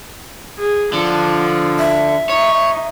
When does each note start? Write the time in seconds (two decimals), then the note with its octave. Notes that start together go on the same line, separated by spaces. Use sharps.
0.59 G#4
0.93 D3 F3
1.79 E5
2.29 D#4 C#5